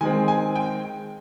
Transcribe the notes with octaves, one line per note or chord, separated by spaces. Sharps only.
D#3 G#3 C4 G#5
G#5
G5